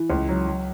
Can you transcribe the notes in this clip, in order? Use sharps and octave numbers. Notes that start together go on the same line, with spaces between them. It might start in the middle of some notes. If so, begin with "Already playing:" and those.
Already playing: E3
C#2
F#3
F#3